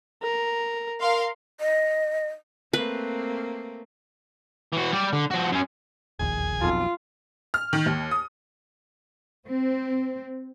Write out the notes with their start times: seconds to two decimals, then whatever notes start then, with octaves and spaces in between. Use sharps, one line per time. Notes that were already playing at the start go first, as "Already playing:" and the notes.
0.22 A#4
1.01 A#4 F5 C6
1.60 D#5
2.73 A3 A#3 C4 B4
4.73 E3 F#4
4.93 G3 D5
5.13 D3
5.31 F3 F#4
5.52 F#2 C#4
6.19 E1 A#1 D#2 G#4 G#5
6.61 B1 F2 F4 A5
7.54 F6
7.73 D#3
7.86 D#2
8.11 D#6
9.47 C4